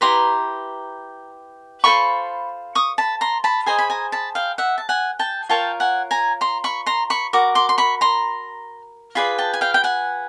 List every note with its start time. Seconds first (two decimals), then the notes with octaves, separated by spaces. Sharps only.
0.01 E4 G4 B4 A#5 C6
1.84 F4 A4 C5 B5 C#6
2.75 C#6 D#6
2.98 A5 B5
3.21 A#5 C6
3.44 A5 B5
3.66 G#4 C5 D#5 G#5 A#5
3.79 B5
3.90 G#5 A#5
4.12 A5 B5
4.35 F5 G5
4.58 E5 F#5
4.78 A5
4.89 F#5 G#5
5.19 G5 A5
5.49 F4 A#4 C#5 G5 A5
5.80 F#5 G#5
6.11 G#5 A#5
6.41 A#5 C6
6.64 B5 C#6
6.86 A#5 C6
7.10 B5 C#6
7.33 F#4 A#4 D6
7.55 C6 D6
7.69 C6
7.78 B5 C#6
8.01 A#5 C6
9.15 F4 G#4 B4 D5 B5
9.38 G5 A5
9.53 G#5
9.61 F5 G5
9.74 G5
9.84 F#5 G#5